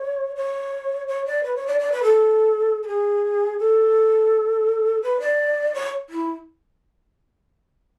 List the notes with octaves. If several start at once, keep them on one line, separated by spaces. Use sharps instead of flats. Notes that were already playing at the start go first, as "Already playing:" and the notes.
Already playing: C#5
C#5
C#5
D5
B4
C#5
D5
D5
B4
A4
A4
G#4
A4
B4
D5
C#5
E4